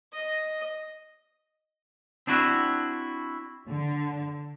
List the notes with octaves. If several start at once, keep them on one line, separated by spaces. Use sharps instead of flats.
D#5
C4 D4 E4 F#4
D3